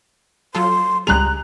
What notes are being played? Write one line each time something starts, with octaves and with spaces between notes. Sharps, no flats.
F#3 F4 A4 C6
C#2 G3 G#4 A#5 F#6 F7